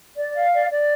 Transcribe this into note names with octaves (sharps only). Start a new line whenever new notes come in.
D5
F5
D5
D5